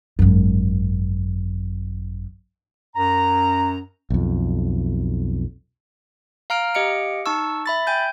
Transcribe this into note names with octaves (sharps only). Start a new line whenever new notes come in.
G#1 F#2
F#2 A#5
B1 F2
F5 A#5 F6 D7
G4 D#5 F5 C#7 D7
D#4 A5 C#6 E6
E5 B5 A6
G5 G#5 G6